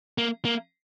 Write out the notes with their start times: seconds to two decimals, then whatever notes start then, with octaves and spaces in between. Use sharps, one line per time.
0.18 A#3
0.45 A#3